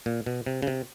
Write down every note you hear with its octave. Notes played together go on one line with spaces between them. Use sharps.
A#2
B2
C3
C#3
C3